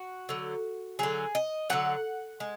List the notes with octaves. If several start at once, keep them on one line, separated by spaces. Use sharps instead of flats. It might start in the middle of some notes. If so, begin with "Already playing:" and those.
Already playing: F#4
D3 F#3
D3 F#3 G#4
D#5
D3 F#3 F#5
G#3